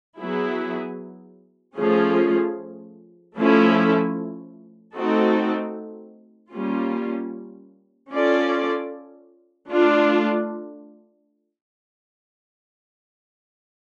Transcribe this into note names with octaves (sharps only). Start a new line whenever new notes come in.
F#3 B3 E4 G#4
F3 A3 C#4 F4 G#4
F3 A3 C#4 E4 A4
A3 C4 D#4 F#4 A4
G3 A#3 C#4 F4
C#4 F4 A4 D5
A3 D4 F4